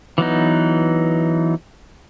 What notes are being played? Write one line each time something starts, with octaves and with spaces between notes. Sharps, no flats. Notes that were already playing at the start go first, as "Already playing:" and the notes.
E3 F#3 B3 D#4